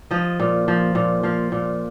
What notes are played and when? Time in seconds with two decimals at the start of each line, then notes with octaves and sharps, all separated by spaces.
0.11 F3 D#5
0.40 A#2
0.68 F3
0.95 A#2
1.23 F3 F5
1.52 A#2